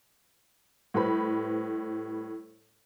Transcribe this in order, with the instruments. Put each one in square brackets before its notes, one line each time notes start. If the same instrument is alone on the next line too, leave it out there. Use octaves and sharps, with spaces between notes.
[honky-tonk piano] A2 G3 B4 C5 B5